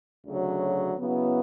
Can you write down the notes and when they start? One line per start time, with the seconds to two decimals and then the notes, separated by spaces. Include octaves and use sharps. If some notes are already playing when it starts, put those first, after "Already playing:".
0.25 D2 C#3 F#3
0.96 C#3 F#3 B3 E4